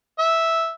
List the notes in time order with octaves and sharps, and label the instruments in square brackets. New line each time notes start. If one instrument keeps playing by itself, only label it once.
[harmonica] E5